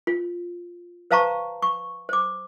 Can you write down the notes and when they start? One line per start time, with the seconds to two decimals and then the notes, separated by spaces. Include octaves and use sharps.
0.07 F4
1.11 B4 C5 F5 A5 A#5 C#6
1.63 C#6
2.09 C5 D6